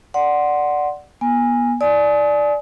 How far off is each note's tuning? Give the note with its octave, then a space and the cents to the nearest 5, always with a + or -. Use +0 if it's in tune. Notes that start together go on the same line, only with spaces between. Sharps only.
D5 +0 F#5 +0 C6 +0
B3 -35 G#5 -15
D5 +0 G#5 +35 D#6 +35